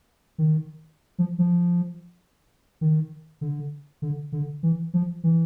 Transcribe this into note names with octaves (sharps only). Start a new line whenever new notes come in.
D#3
F3
F3
D#3
D3
D3
D3
E3
F3
E3